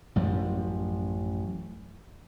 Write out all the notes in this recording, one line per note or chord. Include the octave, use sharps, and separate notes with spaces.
A1 F#2 F3